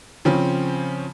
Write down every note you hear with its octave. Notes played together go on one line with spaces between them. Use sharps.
C#3 F3 C4 C#4